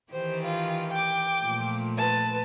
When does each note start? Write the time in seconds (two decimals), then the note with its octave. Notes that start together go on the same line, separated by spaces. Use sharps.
0.13 D#3 E3 G4 C5
0.45 F4
0.92 G5 D6
1.43 A#2 F3 A3
1.97 B4 A5